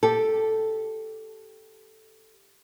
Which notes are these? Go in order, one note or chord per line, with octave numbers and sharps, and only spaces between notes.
G4 A4